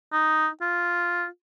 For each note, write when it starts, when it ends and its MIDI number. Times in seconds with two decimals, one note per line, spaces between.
0.12 0.48 63
0.61 1.26 65